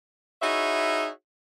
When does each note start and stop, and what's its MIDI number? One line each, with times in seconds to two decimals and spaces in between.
0.42 1.09 63
0.42 1.09 64
0.42 1.09 66
0.42 1.09 68
0.42 1.09 73
0.42 1.09 76